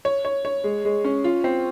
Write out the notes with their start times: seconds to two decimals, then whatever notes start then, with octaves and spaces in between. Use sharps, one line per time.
0.05 C#5
0.25 C#5
0.45 C#5
0.64 G#3
0.85 G#3
1.04 C#4
1.24 F4
1.44 C4